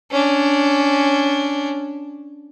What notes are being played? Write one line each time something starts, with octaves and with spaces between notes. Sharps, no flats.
C#4 D4